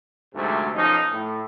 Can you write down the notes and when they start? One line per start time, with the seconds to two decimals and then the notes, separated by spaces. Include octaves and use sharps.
0.34 D2 G#2 C3 F#3 A3
0.73 B1 F3 C#4 D#4
1.11 A2